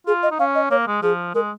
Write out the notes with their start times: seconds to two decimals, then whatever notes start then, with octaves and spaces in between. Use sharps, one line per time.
0.07 F4 G#4
0.23 D#5
0.31 D#4
0.39 C#4 F5
0.55 D#5
0.71 A#3 C#5
0.87 G#3
1.03 F3 G#4
1.35 G#3 A#4